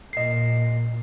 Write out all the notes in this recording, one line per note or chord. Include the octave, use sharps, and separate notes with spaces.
A#2 D#5 C7